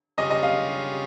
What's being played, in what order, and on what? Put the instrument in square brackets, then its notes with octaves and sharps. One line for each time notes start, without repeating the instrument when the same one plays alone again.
[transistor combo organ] C#3 G3 C#4 F4 G#4 [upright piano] D#5
[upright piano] D#5
F5